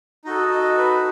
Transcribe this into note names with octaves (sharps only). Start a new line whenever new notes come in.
D#4 F#4 A4 D#5
D#5
B4